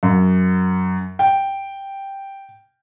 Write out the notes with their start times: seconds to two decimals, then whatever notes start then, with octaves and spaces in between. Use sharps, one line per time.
0.03 F#2
1.19 G5